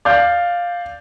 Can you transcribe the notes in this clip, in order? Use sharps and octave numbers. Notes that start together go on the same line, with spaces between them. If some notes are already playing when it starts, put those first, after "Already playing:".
D5 F5 G6